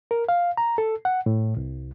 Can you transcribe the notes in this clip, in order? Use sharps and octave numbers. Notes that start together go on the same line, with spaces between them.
A#4
F5
A#5
A4
F#5
A2
C2